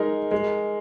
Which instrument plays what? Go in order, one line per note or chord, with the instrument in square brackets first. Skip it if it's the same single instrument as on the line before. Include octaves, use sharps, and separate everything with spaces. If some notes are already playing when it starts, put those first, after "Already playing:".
Already playing: [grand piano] G#3 D#4 A#4
G#3